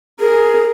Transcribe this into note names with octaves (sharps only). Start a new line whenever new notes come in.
G#4 A#4